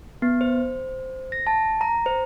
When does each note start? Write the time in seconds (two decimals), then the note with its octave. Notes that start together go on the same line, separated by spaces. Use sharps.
0.22 B3
0.41 C5
1.32 A#6
1.47 A5
1.81 A#5
2.06 C5